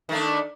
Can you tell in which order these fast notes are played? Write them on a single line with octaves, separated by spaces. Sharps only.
D#3 A3 D4